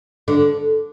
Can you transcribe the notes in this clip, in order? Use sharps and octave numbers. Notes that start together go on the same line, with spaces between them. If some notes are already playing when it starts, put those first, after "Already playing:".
D3